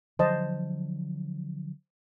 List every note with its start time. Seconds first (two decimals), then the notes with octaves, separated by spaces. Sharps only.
0.19 D3 F3 F#3 C5 D#5 A5